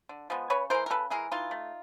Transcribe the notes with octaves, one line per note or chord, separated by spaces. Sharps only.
D3
F3 G#3 B3
C#3 B4 C#5
E3 G#3 A#4 C5
A#4
C#3 A4 B4
E3 G#3 G#4 A#4
E3 D#4 F4
A3